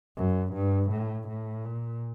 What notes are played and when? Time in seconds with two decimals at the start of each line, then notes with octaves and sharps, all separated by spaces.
0.17 F#2
0.54 G2
0.91 A2
1.28 A2
1.65 A#2